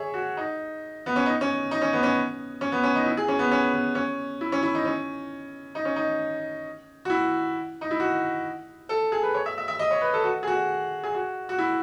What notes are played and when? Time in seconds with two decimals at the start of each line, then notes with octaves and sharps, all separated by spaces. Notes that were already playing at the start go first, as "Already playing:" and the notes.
Already playing: G#4 C#5 E5
0.14 F#4
0.37 D#4
1.06 B3
1.16 C#4
1.26 D#4
1.41 C#4
1.71 D#4
1.82 C#4
1.93 B3
2.03 C#4
2.61 C#4
2.72 B3
2.83 C#4
2.95 D#4
3.06 E4
3.17 G#4
3.28 C#4
3.39 B3
3.51 C#4
3.74 B3
3.95 C#4
4.41 E4
4.52 C#4
4.63 E4
4.75 D#4
4.85 C#4
5.75 D#4
5.85 C#4
5.96 D#4
7.05 F#4
7.10 E4
7.81 D#4
7.91 E4
8.00 F#4
8.89 A4
9.12 G#4
9.23 B4
9.34 C#5
9.46 E5
9.58 E5
9.68 E5
9.79 D#5
9.91 C#5
10.01 B4
10.13 A4
10.24 F#4
10.43 G#4
10.47 F#4
11.04 G#4
11.15 F#4
11.49 F#4
11.58 E4